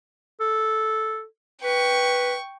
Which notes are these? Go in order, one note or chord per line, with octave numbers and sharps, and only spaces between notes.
A4
B4 G5 C#6